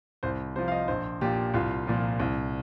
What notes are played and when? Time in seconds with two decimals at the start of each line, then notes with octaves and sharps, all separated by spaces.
0.23 C2 C5
0.56 C3 F3 C5
0.68 F5
0.72 D#5
0.88 A#1 C5
1.21 A#2 F3 G4
1.54 C2 F4
1.87 A#2 F3
2.20 C2